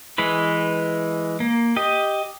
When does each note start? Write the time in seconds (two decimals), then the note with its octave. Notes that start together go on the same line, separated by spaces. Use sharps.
0.18 E3 G#3 B4
1.40 A#3
1.76 G4 D#5